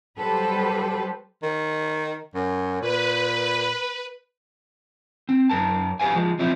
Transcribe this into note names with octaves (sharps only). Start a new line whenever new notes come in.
F#3 G3 G4 A4 B4 C5
D#3
F#2
A#2 B4
C4
F#2 A#4 A5
F#4 G4 B4 F5 G#5
F3 G#3
F3 F#3 C4 D#4 E4